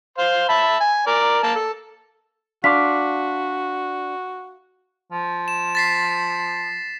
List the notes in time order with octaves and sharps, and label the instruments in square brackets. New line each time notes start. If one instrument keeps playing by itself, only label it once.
[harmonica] C5 F5 C6
E5 A5 B5
G#5
A#4 D5
A#3 A5
A4
[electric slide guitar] D4 [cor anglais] F#4 [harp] F5 C6 D6 [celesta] B6
[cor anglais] F3
[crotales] E7
A6 B6 C7